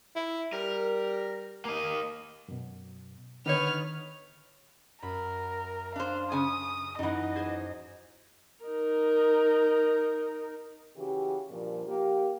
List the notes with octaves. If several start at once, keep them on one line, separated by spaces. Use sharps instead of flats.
E4
G3 A#4
A#3 D#5
F#2 B2
D3 D#3 B3 D#4 B4 C#5 F6
F#2 A#4 B5
D4 C5 F5
C#3 G#5 D#6
F#2 E3 D#4 D#5 F#5
G#4 C5 G#6
D#4 A#4
C#3 E3 F#4 G4
G2 A#2 F3
A#3 G4